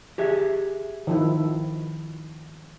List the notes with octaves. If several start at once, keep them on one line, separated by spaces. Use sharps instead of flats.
G4 G#4 E5
D#3 F3 E4